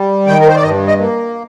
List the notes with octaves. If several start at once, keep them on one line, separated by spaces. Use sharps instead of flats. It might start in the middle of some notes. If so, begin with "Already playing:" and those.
Already playing: G3
D#3 G5
A#4
C5
D5
G2 D#5
D#5
A#3